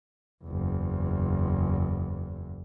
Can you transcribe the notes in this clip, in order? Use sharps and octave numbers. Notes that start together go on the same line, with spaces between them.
F#1 E2